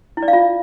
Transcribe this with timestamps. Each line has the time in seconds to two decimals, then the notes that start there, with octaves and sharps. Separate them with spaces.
0.17 E4
0.23 D5
0.28 F5
0.33 F4